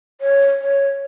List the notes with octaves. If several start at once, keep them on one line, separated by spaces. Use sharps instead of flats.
C#5
C#5